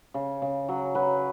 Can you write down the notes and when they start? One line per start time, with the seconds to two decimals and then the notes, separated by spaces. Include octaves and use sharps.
0.14 C#3
0.42 C#3
0.69 F#3
0.95 F#3 B4